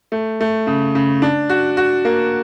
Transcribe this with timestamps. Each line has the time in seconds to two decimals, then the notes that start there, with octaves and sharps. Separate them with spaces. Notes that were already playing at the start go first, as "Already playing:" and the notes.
0.12 A3
0.41 A3
0.67 C#3
0.95 C#3
1.22 D4
1.49 F#4
1.77 F#4
2.05 A#3